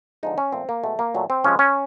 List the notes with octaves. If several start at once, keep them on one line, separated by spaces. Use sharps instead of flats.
D3 F3 G#3 D#4
C#4
A#2 F3 A3 C4
A#3
B2 G#3 A3
A#3
A#2 F#3 A3
C4
C3 F3 G#3 C#4
C#4